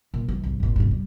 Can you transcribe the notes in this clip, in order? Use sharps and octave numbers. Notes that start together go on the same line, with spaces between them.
A#2
D#3 E3
C2 G#2
G#1 A#2
E1 G#2
G3